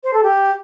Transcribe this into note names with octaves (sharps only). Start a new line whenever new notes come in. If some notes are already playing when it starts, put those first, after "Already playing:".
C5
A4
G4